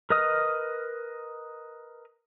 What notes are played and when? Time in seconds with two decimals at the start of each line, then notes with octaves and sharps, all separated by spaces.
0.10 A#4 B4 D#5 D#6 F6